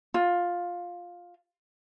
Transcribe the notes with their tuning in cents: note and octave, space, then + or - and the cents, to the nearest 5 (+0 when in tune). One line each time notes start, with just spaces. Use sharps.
F4 +10